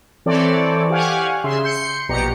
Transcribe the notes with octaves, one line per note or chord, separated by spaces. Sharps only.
E3 C4 A4 C#5 D5
G4 D5 F5 F#5 G#5 C#6
C#3 G#4 E5 C6
C6 G6 C#7
A#1 B2 G4 D5 A#5 C#7